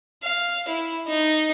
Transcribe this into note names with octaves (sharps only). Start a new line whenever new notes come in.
F5
E4
D#4